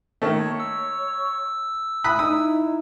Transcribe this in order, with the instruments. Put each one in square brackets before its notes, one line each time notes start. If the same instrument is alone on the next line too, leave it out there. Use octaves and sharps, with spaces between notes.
[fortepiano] D#3 A3 [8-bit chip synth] A#3 [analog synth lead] C#5
[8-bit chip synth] E6
[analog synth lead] E4 [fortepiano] B5 D#6 F#6
[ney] D#4 [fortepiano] D#6